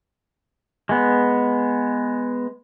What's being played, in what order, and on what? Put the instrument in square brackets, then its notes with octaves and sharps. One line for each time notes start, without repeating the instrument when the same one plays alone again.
[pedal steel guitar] G#3 B3